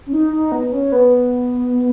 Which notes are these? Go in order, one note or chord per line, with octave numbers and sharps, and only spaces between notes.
C#4
D#4
D#4
B3
C#4
B3